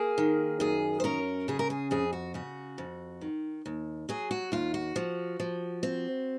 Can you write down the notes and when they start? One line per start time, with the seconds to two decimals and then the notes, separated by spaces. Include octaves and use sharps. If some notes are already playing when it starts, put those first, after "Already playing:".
Already playing: A#3 G#4
0.18 D#3
0.60 F#2 G#4
1.00 C5
1.04 C#4 A#4
1.48 C#3 G#4
1.59 A#4
1.70 G#4
1.91 F2 G#4
2.13 F#4
2.34 C#3 F#4
2.78 F2
3.21 D#3
3.66 D#2
4.09 F#3 G#4
4.31 F#4
4.52 D#2 F4
4.74 F#4
4.96 F3
5.40 F3
5.83 C4